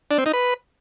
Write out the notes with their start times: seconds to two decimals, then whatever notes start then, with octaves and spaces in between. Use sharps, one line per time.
0.11 D4
0.18 C4
0.26 D#4
0.33 B4